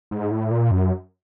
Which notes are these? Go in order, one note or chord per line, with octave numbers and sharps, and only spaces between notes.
G#2
A2
A#2
F#2